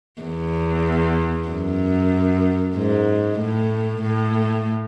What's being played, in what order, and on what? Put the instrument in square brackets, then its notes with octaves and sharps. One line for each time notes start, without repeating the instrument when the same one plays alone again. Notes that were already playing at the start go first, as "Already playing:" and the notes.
[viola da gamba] E2
F#2
G#2
A2
A2